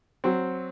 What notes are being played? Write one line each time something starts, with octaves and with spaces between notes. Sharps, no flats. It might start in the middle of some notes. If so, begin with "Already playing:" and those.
F#3 C4